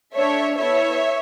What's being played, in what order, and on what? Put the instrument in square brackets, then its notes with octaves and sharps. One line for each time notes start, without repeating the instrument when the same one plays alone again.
[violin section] A3 D4 A4 C#5 E5
B3 E4 A4 C#5 E5